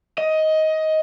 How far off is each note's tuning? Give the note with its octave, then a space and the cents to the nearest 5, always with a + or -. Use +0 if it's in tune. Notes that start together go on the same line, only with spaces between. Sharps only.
D#5 +15